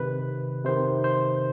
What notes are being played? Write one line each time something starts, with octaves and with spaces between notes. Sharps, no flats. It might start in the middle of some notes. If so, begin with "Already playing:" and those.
Already playing: C3 D#3 B4
C3 D#3 C5
C5